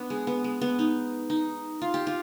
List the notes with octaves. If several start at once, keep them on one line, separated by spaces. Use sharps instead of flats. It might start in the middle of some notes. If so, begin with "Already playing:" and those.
Already playing: B3 D4
G#3
B3
G#3
B3
D#4
D#4
F4
G4
F4